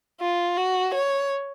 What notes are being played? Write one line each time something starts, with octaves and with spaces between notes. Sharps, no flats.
F4
F#4
C#5